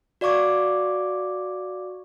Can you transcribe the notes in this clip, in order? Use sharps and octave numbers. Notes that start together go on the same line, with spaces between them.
F#4 D5 F5 C#6 D6 G#6